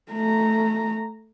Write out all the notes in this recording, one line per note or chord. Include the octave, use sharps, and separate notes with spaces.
A3 A#5